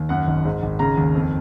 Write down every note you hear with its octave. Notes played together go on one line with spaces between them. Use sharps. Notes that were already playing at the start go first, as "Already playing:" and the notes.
Already playing: D#2
F#2 F#5
G#1
G#2
G#1
C#3 A#5
D#2
F2